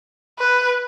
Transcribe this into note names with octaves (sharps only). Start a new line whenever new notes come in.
B4